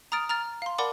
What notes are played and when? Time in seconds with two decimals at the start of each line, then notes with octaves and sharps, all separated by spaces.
0.12 A#5 D#6 F6 A6 D7
0.29 A#5 F6 A6
0.62 F5 C6
0.78 A#4 D5 F#5 A5 B5 D6